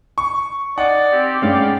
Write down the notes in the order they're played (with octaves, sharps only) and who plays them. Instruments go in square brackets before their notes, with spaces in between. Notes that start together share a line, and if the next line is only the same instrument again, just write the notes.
[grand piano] C#6
[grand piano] D#4 F#5 [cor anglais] D5
[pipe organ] C4 G4
[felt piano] G2 G#3 C#4 [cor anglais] G4 [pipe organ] D5 F5